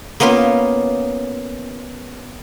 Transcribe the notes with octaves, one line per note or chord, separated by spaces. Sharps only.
A#3 B3 C#4 F4 B4